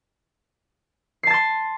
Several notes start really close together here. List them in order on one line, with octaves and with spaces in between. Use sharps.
C7 A5 A6 C6